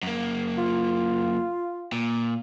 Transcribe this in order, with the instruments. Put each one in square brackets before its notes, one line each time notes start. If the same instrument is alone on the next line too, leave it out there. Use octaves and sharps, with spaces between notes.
[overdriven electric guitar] F#2 A#3
[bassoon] F4
[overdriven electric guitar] A#2